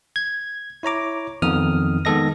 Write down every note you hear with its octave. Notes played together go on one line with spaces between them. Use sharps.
G#6
E4 C#5 A#5 D6
F2 D#3 B3 D#4 D#6 F6
D#3 G#3 B3 A4 D#5 A#6